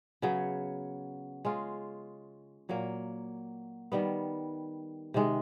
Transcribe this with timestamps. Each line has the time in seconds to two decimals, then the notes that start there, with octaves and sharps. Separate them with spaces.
0.22 C#3 F#3 B3
1.45 G#3 C#4 F4
2.69 A#2 F#3 A#3
3.92 D#3 G3 B3
5.14 C3 D#3 G#3